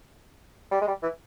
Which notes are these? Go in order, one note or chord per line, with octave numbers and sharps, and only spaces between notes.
G3
G#3
G3
E3